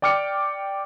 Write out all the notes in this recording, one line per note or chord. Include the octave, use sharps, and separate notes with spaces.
D5 G5 D6 F6 C#7